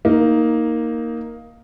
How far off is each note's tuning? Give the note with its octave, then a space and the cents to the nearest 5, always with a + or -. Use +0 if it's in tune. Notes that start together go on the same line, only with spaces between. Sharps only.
A#3 +0 D#4 +10